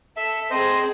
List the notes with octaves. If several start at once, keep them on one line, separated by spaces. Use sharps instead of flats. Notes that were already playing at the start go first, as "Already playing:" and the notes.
A4 E5
C4 G#4 C5 D#5